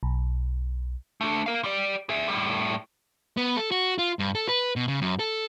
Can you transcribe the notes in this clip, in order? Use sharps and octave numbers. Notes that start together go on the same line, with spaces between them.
B1
A3 D4
A#4 F5
G3 D5
G#4 E5
A2 G3
B3
A4
F#4
F4
G2
A4
B4
B2
C#3
F#2
A4